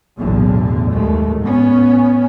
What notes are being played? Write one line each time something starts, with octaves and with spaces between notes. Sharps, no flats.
F#1 B1 E2 A2 D3
D#2 G#2 G#3 A3
A1 B3 C#4